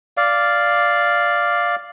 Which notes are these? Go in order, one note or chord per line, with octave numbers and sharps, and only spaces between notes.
D5 F5